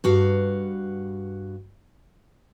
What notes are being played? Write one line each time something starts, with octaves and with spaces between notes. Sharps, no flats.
G2 F#4 F5